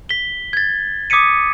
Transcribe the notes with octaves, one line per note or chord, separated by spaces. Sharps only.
B6 G7
G#6 A6
D6 D#6 G#6 B6 C#7 D#7